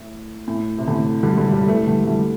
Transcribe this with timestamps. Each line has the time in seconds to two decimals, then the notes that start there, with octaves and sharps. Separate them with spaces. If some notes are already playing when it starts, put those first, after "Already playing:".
Already playing: A2
0.48 A2
0.78 C3
0.87 A2 D3
1.23 D3 G3
1.37 D3 G3
1.52 D3 G3
1.63 G3
1.68 E3 A3
1.87 D3 G3
2.04 A3
2.07 D3 G3